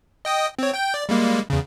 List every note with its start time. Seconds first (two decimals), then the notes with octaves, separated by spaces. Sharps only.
0.25 D#5 G5 D#6
0.59 C4 C#5
0.74 G5 G6
0.94 D5
1.09 G3 G#3 A#3
1.50 E2 C#3